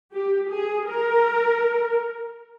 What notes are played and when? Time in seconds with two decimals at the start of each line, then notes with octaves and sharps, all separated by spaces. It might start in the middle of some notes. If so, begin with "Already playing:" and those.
0.11 G4
0.48 G#4
0.86 A#4